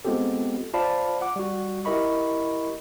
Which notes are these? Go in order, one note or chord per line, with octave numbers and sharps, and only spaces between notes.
G#3 B3 C4 F4 G4 A4
F4 C5 D5 F5 A5 B5
F#5 D6
G3 F#4
E4 G4 A#4 D#5 B5 C#6